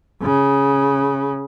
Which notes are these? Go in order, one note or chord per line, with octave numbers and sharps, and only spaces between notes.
C#3